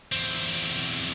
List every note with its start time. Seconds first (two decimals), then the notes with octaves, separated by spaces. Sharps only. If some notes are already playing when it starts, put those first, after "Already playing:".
0.12 E2 C4